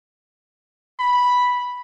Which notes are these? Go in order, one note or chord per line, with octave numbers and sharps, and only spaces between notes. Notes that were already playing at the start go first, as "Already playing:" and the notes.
B5